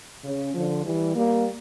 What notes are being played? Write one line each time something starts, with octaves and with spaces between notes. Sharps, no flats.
C#3
D3 F3
E3 G3
G3 A#3